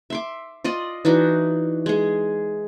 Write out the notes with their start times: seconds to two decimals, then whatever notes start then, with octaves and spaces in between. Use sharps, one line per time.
0.10 E5 C6 D6
0.64 F4 D5 D#5 C6
1.05 E3 D4 D#4 F#4
1.86 G#3 G#4